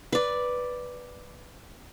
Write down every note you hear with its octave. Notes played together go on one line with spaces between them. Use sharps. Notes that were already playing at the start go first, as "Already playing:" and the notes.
B4 D5